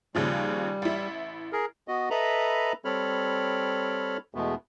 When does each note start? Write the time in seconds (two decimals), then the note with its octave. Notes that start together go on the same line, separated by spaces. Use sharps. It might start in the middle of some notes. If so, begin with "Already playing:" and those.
0.15 D#2 C#3 F3 G3
0.82 A1 E4
1.52 G#4 A#4
1.88 B3 F#4 D#5
2.10 A4 B4 D#5 E5 A#5 B5
2.85 G3 C4 A4 C#5 B5 F6
4.35 E2 B2 G#3 A3 B3